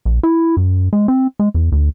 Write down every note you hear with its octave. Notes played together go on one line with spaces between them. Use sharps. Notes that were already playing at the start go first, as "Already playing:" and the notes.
A#1
E4
F#2
G#3
C4
G#3
E2
D2